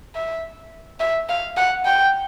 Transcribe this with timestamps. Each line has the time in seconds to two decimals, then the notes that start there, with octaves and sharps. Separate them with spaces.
0.15 E5
1.00 E5
1.29 F5
1.57 F#5
1.85 G5